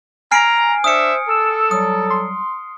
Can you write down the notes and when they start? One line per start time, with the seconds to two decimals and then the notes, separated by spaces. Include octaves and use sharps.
0.31 G#5 A#5 F6 C7 D7
0.84 D4 C5 E5 D#6 C#7
1.28 A4 E6
1.71 F#3 G3 D#6
2.10 C6